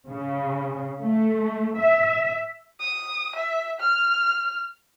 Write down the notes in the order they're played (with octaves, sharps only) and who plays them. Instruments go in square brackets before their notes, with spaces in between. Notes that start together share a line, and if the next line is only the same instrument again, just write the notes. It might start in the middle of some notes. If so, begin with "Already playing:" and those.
[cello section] C#3
A3
E5
[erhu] D#6
E5
F6